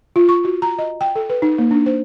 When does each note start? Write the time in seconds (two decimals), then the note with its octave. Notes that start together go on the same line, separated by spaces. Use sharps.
0.16 F4
0.29 C#6
0.45 F#4
0.62 A#5
0.78 D#5
1.01 G5
1.16 A4
1.29 B4
1.42 D#4
1.58 A#3
1.71 D4
1.86 C5